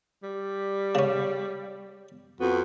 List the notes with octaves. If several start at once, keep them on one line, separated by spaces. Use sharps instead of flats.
G3
C#3 C#4
F2 B3 F#4